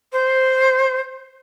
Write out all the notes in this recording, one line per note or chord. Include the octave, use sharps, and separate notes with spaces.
C5